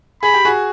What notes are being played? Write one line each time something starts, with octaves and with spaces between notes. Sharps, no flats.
G#4 B5
G4
F#4 G#4